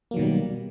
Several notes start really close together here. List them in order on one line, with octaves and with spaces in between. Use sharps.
A#3 F#3 D#3 B2 G3